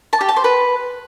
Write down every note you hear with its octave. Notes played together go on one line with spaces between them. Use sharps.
A5
G4
A5
C5
B4